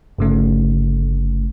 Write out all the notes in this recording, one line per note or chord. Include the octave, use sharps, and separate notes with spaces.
G1 C#3 A3